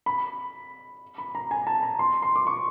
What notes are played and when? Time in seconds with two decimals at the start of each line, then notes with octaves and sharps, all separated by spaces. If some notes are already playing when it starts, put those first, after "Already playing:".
0.06 B5
1.18 B5
1.35 A#5
1.51 G#5
1.67 A5
1.83 A#5
1.99 C6
2.22 C6
2.36 D6
2.47 C#6